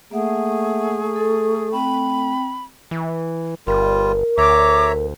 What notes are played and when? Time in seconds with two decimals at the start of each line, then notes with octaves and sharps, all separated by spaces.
0.11 A3 A#3 G#4 E5 F#5
1.16 A4
1.72 C4 G5 B5
2.91 E3
3.67 G1 G3 F4 A#4
4.38 D2 C#5 E5 A#5 D6